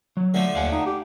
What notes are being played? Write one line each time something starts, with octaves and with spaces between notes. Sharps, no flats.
F#3
D3 F3 A3
D#2 F5 F#5 G#5
D#4
G4